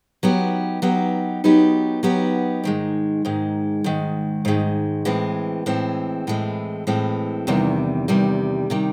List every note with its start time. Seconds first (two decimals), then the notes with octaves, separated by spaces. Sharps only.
0.23 F#3 B3 D#4 G4
0.82 F#3 B3 D#4 G4
1.44 F#3 B3 D#4 G4
2.03 F#3 B3 D#4 G4
2.63 G#2 D#3 G#3
3.25 G#2 D#3 G#3
3.84 G#2 D#3 G#3
4.45 G#2 D#3 G#3
5.05 A2 E3 G#3 C4
5.66 A2 E3 G#3 C4
6.27 A2 E3 G#3 C4
6.87 A2 E3 G#3 C4
7.47 E2 C3 D#3 G3
8.08 E2 C3 D#3 G3
8.70 C3 D#3 G3